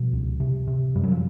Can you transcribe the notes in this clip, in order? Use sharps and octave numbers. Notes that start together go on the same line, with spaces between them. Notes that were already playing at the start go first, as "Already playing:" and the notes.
Already playing: B2 F3 G3
C#2
C3
C3
F#2 G3
F#3
F3